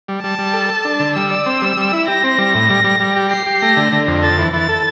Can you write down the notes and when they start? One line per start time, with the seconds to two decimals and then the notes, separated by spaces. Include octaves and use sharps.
0.08 G3
0.23 G3 A5
0.39 G3
0.53 A4
0.69 A4
0.85 D4
1.00 D3
1.15 G3 E6
1.31 D5
1.46 C4
1.62 G3
1.77 G3
1.93 E4
2.08 G4 A#6
2.24 C4
2.38 G3
2.55 A2
2.70 G3
2.84 G3
3.00 G3
3.16 G4
3.31 G4 C7
3.46 G4
3.62 A3 A#6
3.77 D3
3.93 D3
4.07 F2
4.23 A4 A6
4.39 E3
4.53 E3 A6
4.69 A4